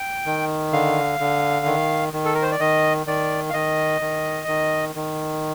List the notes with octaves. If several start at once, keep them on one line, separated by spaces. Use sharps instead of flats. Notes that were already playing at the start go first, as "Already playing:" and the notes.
Already playing: G5
D#3
D3 F5
D3
D#3
D#3
A4
A#4
C5
D5
D#3 D#5
D#3 D5
F5
D#3 D#5
D#3
D#3
D#3